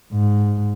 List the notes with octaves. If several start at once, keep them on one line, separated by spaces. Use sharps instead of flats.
G#2